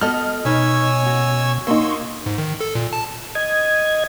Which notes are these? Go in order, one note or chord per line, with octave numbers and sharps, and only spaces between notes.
B3 F#4 A4 D#5 F6
B2 D#4 B4 C#5 G#5 E6
C#4 F#4
A#3 D#4 F#4 C6 C#6 E6
G#2
D#3
A4
A#2
A5
D#5 G#6